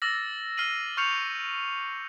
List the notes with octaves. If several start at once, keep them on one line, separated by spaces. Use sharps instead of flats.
D6 E6 F6 A6 A#6
F6 C7 D#7 F#7
C#6 F6 G6 C7 C#7 F7